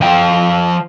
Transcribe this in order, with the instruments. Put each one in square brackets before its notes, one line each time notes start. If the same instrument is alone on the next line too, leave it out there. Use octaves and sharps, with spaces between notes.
[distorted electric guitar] F3 G5